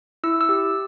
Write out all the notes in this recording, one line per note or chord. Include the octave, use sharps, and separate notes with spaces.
E4 E6
E6
G4